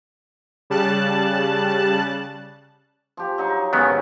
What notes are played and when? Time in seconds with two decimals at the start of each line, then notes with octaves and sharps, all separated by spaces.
0.70 C#3 G3 A5 F#6
3.17 F3 G4
3.38 F#3 D#4 C#6
3.73 G#2 D#3 F#3 B3 C#4